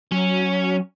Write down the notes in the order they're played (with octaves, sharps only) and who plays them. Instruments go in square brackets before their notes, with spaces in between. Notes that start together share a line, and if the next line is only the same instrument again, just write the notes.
[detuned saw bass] F#3 [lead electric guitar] C#4